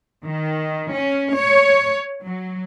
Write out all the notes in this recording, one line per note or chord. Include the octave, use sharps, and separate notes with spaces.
D#3
C#4
C#5
F#3